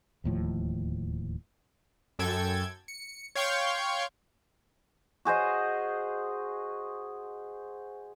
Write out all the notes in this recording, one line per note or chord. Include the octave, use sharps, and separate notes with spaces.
D1 D#2 A2 F3
F#2 A4 G5 G#6
C#7
C#5 F5 G5 C6 C#6 G6
F#4 G#4 C5 D#5